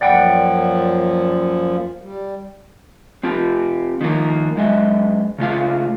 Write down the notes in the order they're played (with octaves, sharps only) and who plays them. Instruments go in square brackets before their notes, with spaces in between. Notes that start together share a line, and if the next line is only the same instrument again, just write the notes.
[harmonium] F#2 A#2 F3 [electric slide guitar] D5 F#5 G5
[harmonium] G3
[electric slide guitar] C4 F4 G4
D#3 F3 A#3
F#2 G#3 D#5 E5
C#3 A3 F4 F5